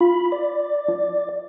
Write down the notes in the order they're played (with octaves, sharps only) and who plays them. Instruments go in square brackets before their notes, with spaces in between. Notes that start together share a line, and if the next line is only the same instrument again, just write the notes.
[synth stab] F4 [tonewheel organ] B5
[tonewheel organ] D5
[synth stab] F3